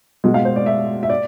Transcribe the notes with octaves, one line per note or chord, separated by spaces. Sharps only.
B2 G#3
F5
C5
D5
E5
E5
D5